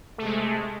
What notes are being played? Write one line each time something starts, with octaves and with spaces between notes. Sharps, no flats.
C3 G#3 A3